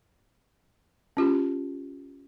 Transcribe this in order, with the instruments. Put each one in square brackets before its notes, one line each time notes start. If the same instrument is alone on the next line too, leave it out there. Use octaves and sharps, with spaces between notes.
[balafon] C#4 F4 G4